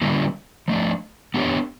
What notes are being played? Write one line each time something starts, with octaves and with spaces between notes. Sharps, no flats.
D3 G3 A#3 C#4 E4
F3 A3 D4
B3 D4 G4 A#4 C#5